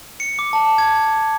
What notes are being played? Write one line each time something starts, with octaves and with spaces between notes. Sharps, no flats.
C#7
D6
A5
G#6